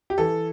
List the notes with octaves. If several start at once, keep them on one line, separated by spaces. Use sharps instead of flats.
G4
E3 A4